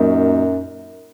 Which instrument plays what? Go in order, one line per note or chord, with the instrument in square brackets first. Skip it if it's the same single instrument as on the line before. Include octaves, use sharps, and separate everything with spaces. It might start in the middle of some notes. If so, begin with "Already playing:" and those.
Already playing: [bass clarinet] F#2 [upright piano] A#2 F#3 A#3 D#4 A#4